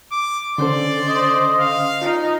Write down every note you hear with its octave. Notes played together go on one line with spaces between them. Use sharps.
D6
D3 C#4 A4 C5 D5
D#5
F5
D#4 F4